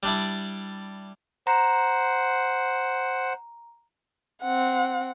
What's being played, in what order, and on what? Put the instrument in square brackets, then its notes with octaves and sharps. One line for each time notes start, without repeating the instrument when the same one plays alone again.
[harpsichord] G3 D4 E4
[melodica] C5 F#5 [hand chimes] A#5
[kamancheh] C4 F#5